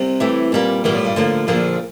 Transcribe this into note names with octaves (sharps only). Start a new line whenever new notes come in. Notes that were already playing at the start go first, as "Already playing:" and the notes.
Already playing: C2 C3
E3 A3 E4 G4
A#2 G3 A#3
E2 A#2 E3 G3 A#3
A2
G2
A2 D3 F3 A#3
A#1 A#2 D3 F3 A#3